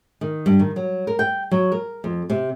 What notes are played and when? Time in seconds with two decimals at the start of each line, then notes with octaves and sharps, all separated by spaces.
0.21 D#3
0.46 G2
0.59 D#3
0.76 F#3
1.07 A#4
1.19 G5
1.51 F#3
1.72 A#4
2.04 F2
2.30 C3